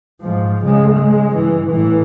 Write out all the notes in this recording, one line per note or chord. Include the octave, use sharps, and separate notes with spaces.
G#2 F3
C#3 G#3
G#3
G2 E3
A2 E3